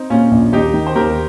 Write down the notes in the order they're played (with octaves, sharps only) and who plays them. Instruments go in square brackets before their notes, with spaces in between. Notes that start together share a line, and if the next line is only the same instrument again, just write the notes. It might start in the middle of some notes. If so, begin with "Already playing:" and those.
Already playing: [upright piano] C4 D#4
[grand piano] A#2 [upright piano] C#4 F4
[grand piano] A#1
[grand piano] D#2 [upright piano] D#4 G4
[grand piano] D#3
[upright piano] C5
[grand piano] D#2 [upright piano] G4 A#4